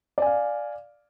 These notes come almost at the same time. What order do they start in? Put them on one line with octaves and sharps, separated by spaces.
D5 G#5 F5